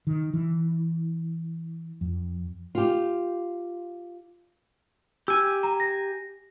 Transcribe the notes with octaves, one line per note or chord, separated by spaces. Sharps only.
D#3
E3
F2
F4 G4
G4 G#5 E6
A#5
A#6